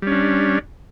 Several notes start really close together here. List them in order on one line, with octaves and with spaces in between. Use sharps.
G3 C#4 D4